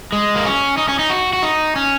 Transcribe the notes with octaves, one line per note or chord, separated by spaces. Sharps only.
G#3
A#3
C#4
D#4
C#4
D#4
F#4
F#4
D#4
C#4